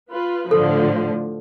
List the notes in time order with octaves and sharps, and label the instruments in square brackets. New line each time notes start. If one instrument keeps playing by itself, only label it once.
[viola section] F4 B4
[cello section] A2 D3 [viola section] F3 [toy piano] A4